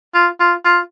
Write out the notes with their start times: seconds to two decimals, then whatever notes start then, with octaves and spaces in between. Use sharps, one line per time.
0.14 F4
0.40 F4
0.65 F4